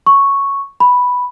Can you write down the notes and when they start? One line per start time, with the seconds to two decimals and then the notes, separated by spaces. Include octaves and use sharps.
0.06 C#6
0.80 B5